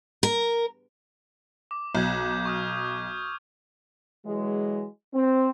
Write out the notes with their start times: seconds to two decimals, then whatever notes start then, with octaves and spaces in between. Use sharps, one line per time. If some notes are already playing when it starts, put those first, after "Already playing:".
0.23 A#4
1.71 D6
1.95 B1 G6 G#6
2.45 C#6 D#6 F6
4.24 E3 F#3 G#3
5.13 C4